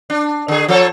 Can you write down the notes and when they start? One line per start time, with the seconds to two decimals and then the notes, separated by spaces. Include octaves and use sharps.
0.10 D4
0.48 D3 G#4
0.68 F3 A4 C#5